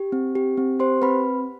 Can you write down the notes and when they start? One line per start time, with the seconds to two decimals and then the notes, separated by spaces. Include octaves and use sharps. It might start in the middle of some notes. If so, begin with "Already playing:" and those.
Already playing: G4
0.12 C4
0.35 G4
0.57 C4
0.79 G4 C5 C6
1.02 C4 B4 B5